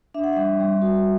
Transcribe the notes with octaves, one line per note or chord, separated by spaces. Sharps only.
D4 E5
F#5
G3 E5
G3
F#4